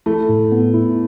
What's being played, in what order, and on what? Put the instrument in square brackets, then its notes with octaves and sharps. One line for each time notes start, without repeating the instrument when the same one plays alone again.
[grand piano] A3 [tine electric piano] E4
[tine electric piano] A2
B3
E4